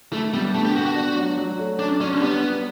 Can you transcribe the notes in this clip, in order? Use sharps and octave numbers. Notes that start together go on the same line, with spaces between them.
A3 E4
G3 B3
D3 A3
G4
B3 F#4
F#4
D4
F#3
F#3
A3
F#3 D4
C#4 D4
G3 B3
G3